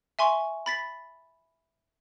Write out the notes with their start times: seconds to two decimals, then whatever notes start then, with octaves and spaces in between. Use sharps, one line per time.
0.19 E5 G#5 C6 C#6
0.66 B5 A6 B6